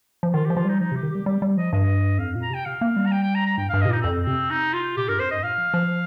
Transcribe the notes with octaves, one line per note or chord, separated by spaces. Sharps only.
F3
D#3 F4
F3 G4
F3 F4
G3 D#4
F3 D#4
C3 G4
D#3
G3 G4
G3 G4
G3
F3 D#5
G2 D#5
F2 F5
A#2
A#5
C3 G5
F5
A#3
G3
A#5
G5
G5
A#5
A#5
G2 G5
G2 F5
C3 D#5
A#2 D#4
F2 C4
C4
C3
D#4
F4
A#2 G4
G2 A#4
F2 C5
G2 D#5
A#2 F5
F3
F3